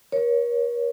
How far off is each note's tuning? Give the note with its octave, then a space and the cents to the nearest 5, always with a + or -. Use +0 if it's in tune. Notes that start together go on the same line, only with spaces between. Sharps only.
A#4 +40 C#5 +0